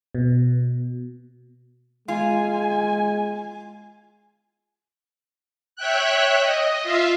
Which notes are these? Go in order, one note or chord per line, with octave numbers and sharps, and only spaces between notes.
B2
G#3 F4 G#5
C#5 E5 G5 F#6
D#5
F4 E5 F5